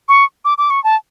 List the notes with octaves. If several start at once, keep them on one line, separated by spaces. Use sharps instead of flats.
C#6
D6
D6
C#6
A5